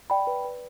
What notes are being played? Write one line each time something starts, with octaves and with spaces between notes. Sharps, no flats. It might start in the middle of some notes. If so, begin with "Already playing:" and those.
D5 G5 B5
B4
B4